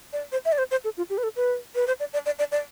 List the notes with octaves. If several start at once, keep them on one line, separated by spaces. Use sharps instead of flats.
D5
C5
E5
D5
C5
C5
A4
F4
G4
B4
A4
B4
B4
C5
D5
D5
D5
D5
D5